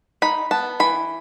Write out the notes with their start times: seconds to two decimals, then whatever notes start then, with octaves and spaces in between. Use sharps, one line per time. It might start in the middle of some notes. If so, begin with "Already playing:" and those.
0.22 D#4 B5
0.51 B3 A5
0.80 E3 B5